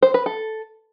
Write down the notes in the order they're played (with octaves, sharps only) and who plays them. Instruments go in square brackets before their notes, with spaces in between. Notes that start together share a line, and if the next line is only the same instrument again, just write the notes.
[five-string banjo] C5
B4
A4